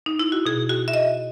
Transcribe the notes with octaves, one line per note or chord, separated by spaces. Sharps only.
D#4
E4
F#4
B2 G#4
F#4
E5
D#5